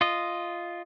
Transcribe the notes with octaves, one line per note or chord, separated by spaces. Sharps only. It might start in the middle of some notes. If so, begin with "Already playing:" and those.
F4 D#5